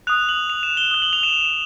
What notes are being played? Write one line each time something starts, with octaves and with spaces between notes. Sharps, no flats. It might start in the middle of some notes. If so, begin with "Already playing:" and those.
D#6 F#6 F7
F#7
F7
E7
G7
D#6 F#6 G7
F#7
F7
E7